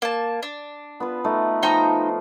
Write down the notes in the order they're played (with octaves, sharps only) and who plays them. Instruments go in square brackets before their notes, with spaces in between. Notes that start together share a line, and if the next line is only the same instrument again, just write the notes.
[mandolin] A#3 A5
D4
[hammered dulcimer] B3 F4 B4
A3 D#4
[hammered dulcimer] F3 F4 [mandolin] D#4 G5 A#5